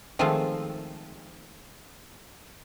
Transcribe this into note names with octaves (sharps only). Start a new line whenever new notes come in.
D#3 F3 G#3 A3 C4 F4